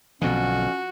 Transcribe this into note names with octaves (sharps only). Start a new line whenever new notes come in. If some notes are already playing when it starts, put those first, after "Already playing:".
B1 F2 B2 D3 C#4 F#4